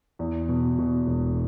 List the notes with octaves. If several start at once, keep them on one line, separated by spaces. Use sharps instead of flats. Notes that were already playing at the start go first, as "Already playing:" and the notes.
E2
B2
B2
E1